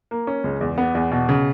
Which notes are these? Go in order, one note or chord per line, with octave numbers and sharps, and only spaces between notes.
A#3
C#4
C#2
E2
B3
E2
B2
C#3